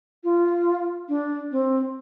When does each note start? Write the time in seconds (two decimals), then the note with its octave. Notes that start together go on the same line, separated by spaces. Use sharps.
0.24 F4
1.09 D4
1.51 C4